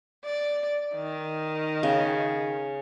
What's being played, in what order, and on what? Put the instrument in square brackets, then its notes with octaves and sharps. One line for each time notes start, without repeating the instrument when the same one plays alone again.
[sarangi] D5
D#3
[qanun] C#3